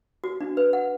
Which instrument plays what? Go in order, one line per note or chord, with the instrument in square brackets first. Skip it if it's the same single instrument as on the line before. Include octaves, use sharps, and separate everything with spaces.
[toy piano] F#4
D4
B4
F#5